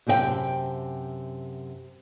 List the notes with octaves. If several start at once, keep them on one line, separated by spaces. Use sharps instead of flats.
F#2 C3 C4 F#4 G5 A5